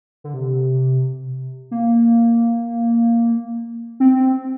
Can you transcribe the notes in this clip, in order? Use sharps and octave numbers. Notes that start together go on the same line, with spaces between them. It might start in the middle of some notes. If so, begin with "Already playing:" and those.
D3
C3
A#3
C4